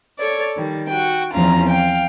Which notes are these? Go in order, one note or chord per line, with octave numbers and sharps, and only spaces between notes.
A4 C#5 D5
D#3 G3
F#4 G5
E2 F3 C4 C#4 F4 A#5
F5 G5